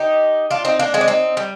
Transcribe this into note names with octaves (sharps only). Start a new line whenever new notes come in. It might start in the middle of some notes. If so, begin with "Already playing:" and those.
Already playing: D#4 G4
D4 F4
C4 D#4
A#3 D4
G#3 C4
D4
C4 D#4
G3